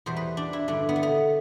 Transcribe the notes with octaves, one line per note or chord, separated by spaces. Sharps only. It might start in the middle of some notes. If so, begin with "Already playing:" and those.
E2 B2 G3 C5
B4
D4
E4
G2 D3 G3 D4
B3
A3
B3